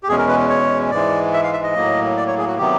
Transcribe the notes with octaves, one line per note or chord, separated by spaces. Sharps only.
G4
E2 B2 G#3 C#4 G#4
A#4
B4
C#5
G#2 E3 G#3 D5
E5
F5
E5
D#5
A2 F#3 A#3
D5
C#5
G#4
F#4
C3 D#3 F#3 B3 G4